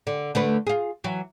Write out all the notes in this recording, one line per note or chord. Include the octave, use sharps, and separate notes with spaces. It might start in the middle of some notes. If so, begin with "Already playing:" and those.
D3
D3 A3 B4
F4 G#4
E3 F#3